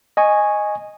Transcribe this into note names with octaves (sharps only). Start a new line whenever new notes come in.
D#5 G#5 C#6